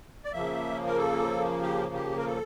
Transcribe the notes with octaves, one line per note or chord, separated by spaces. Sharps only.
D5
C#3 F3 A#3 E5
A#4
A4
G4
G4
A#4
A4